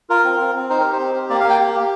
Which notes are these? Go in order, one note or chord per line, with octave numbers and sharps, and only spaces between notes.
F4 A#4
C4
C4
C4
D#4 C5
G4 A#4
C5
C4
G4
A#3 D5
F5
A#3
G5
G4
G4